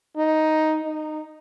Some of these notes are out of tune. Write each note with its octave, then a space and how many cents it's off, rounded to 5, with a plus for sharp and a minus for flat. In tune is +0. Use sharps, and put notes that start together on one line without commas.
D#4 +5
D#4 -15